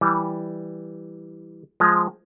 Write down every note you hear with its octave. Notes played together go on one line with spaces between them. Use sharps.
E3 G3
F3 G#3